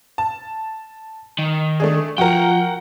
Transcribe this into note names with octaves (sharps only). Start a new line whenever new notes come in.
A5
D#3
A3 D4 G#4
F3 F#4 A#4 F#5 G5